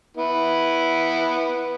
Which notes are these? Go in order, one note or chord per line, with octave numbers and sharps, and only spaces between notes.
B3 E4 B4